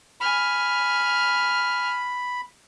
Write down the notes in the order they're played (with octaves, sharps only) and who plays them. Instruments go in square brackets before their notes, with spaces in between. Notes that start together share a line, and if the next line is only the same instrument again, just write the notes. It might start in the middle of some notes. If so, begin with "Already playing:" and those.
[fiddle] G#5 F6 [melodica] B5